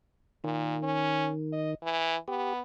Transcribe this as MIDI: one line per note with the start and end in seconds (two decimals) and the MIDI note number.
0.44 0.77 46
0.44 1.75 51
0.83 1.29 61
1.53 1.72 75
1.83 2.16 52
2.28 2.61 59
2.28 2.53 67